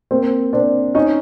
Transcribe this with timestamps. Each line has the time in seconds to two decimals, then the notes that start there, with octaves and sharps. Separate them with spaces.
0.11 A#3 C4
0.53 C4 D4
0.95 C#4 D#4